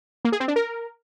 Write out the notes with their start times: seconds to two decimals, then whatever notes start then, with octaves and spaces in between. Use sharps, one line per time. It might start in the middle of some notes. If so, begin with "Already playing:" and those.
0.25 A#3
0.32 G#4
0.40 C4
0.48 D4
0.56 A#4